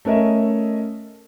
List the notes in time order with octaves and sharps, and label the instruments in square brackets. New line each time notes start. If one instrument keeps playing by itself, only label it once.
[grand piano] A3 C#4 A#4 D#5 E5